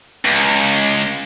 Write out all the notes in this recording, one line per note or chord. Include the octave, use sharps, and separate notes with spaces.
C#2